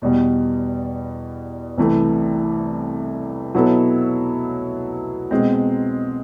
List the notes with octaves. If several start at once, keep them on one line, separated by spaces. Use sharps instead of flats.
E2 B2 G3
C2 C3 E3 A3
B2 F#3 B3 E4 A4
B2 G#3 C4